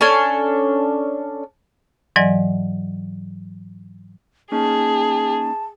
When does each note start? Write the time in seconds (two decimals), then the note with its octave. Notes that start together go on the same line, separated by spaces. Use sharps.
0.01 C#4 D4 A4 G#5
2.16 G#2 E3 F#3 D5 D#5 G#5
4.52 A#3 C#4 D#4 G#4 A5